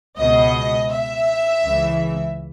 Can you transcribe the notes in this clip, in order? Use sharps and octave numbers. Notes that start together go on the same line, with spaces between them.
C#2 B2 D#5
E5
C#2 C#3 E3